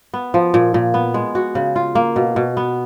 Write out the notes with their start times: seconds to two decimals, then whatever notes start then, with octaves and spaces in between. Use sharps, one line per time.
0.14 B3
0.34 F3
0.54 A#2
0.74 A#2
0.94 B3
1.14 G#3
1.35 F#4
1.55 C#3
1.76 F4
1.95 A#3
2.16 B2
2.36 B2
2.57 B3